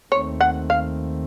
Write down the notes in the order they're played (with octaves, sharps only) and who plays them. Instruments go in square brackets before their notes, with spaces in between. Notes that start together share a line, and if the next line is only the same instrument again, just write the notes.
[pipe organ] D#2 D#3 A3 C4 [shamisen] C#5
[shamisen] F#5
F5